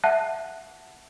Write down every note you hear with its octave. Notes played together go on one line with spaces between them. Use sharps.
E5 F#5 A5 F#6